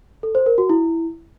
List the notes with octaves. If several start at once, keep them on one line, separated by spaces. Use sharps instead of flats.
A4
C5
A#4
F#4
E4